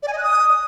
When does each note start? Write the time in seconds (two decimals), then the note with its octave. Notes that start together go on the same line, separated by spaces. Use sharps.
0.03 D5
0.08 G#5
0.13 D#5
0.18 F#6
0.23 D#6